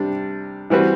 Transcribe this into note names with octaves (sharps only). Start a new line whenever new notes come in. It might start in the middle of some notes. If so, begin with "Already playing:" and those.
Already playing: C3 G3 D4
E3 G3 C4 F#4 B4